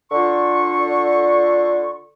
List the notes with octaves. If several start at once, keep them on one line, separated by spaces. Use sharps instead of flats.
D3 F4 C#6